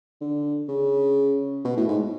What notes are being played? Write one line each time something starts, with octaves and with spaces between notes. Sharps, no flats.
D3
C#3
B2
A2
G#2